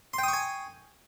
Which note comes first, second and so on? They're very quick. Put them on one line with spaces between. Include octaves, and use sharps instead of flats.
C6 G5 D#6 C#6 G#5